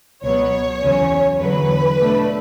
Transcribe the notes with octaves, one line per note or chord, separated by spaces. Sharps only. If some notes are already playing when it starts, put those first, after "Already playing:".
C#2 B2 F#3 B3 C#5
E2 C#3 F#3 C#4
E2 D3 F#3 B4
B2 A3 D4